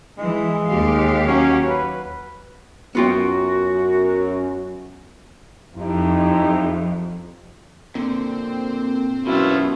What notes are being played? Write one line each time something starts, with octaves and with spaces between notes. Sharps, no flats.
E3 G#3
D#2 G4 F5
F#3 C#4
B4
F#2 B3 F4 F#4 G5
F2 D#4 E4 G4
A#2 D3 C4
F#2 B2 B3 E4 F4